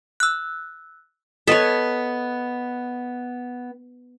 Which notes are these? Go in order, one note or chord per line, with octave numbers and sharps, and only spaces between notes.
E6 F#6
B3 A4 B4 C#5 D#5 D#6 B6